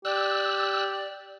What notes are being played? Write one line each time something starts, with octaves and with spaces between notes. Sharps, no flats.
G4 D5 E6 F#6